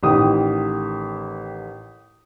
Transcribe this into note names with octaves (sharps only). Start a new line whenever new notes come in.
A1 D#3 G4 D#6